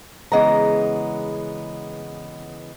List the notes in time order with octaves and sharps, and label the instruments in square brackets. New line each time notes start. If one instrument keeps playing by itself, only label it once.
[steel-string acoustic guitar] C#3 E3 G#3 B3 F#5 A#5